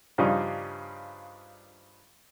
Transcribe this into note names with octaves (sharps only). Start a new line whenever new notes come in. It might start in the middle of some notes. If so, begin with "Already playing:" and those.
G2 C#3 F3 G3 D4 D#4